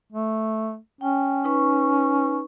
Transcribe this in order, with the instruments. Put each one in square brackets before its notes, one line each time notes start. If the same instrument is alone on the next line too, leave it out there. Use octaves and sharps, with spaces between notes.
[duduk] A3
[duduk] C#4 [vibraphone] G5
[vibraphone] D#4 B4 C#6